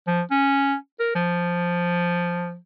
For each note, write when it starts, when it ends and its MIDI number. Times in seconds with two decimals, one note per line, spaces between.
0.07 0.22 53
0.31 0.75 61
1.00 1.11 70
1.15 2.56 53